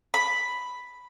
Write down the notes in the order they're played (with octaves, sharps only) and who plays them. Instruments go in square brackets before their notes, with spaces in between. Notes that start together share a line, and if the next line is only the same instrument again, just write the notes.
[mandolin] B5